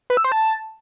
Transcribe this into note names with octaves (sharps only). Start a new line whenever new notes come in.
B4
E6
C5
A5